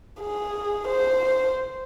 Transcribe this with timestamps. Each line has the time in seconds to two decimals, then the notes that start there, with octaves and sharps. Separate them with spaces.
0.21 G#4
0.87 C5